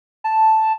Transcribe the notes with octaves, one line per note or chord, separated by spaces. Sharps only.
A5